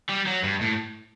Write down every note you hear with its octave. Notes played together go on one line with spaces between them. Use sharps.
G3
F#3
G2
A2